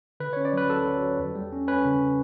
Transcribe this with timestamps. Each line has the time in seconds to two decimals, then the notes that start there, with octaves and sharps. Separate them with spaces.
0.20 D3 B4
0.33 C#4 C#5
0.45 D5
0.53 F#3 B4
0.69 F#3 A4
0.86 F#3
1.03 F#3
1.19 E2
1.35 G3
1.52 C#4
1.68 C#4 B4
1.85 C#3